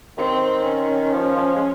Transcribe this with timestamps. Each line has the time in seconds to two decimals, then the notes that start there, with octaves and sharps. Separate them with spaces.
0.17 D#3 C4
0.64 C#4
1.13 F3
1.36 F3
1.55 G#3